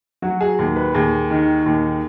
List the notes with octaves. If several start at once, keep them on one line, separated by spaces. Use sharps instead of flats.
F#3 F#4
G#4
D#2
B4
D#2 G#4
D#3
D#2